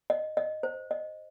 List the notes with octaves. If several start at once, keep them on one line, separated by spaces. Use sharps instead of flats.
D#5
D#5
C5
D#5